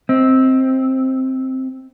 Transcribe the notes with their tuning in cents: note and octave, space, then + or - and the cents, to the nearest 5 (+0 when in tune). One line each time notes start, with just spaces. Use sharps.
C4 +0 D#5 +35